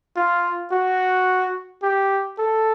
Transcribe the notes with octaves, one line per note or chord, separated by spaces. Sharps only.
F4
F#4
G4
A4